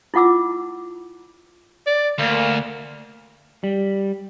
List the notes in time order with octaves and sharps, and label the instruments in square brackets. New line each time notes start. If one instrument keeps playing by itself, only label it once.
[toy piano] E4 F4 F#5 D6 E6
[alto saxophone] D5
[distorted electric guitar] D2 [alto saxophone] A#3
[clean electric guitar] G3